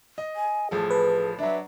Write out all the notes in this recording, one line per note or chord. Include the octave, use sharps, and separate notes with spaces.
D#5
G#5
A1 F3 G#4 A4
B4
F#3 D4 E5